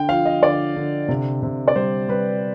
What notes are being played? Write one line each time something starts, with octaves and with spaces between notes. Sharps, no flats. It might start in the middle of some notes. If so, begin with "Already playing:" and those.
Already playing: D3 G5
F3 F5
D#5
D3 D5
D3
C3
C3
D5
G3 C5
G3 B4